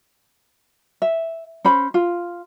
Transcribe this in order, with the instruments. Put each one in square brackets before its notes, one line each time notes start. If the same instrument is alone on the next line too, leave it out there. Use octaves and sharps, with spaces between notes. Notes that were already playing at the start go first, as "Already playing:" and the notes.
[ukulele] E5
C#4 C5 B5
F4